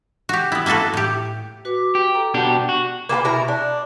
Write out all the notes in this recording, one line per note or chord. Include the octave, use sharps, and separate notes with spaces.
F#4 G4
B3 E4
A#3 E4 F#4 A4 B4
A2 G4
F#4 B4 D6
G4
A4 A#5
B2 D4 G4 F#5
F#4
A#3 F4 G4 B4
B2 E4 A#4 A#5
D4